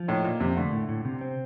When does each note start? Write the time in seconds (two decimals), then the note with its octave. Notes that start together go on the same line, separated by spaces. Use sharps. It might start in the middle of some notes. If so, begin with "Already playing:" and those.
Already playing: F3
0.08 A2 D#4
0.24 A#2 A#3
0.40 F2 C3
0.57 D3 A3
0.72 A2
0.89 A2
1.05 C3
1.21 C4